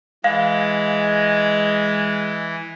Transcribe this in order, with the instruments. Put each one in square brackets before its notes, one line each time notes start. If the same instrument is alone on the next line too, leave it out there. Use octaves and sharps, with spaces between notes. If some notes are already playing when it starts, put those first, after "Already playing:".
[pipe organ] E3 [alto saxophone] G#3 [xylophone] F5